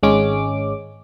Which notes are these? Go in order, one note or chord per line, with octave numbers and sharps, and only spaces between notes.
G#1 G#3 C#4 D6